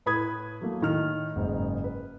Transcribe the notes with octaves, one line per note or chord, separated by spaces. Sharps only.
A2 B4 B5 D#6 G#6
F#3 A3 A#3
A2 D#3 F6 F7
F#1 G#2
B4